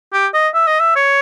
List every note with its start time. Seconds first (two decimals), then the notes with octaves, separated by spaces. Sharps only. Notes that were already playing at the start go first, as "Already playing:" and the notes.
0.13 G4
0.34 D#5
0.54 E5
0.67 D#5
0.80 E5
0.96 C#5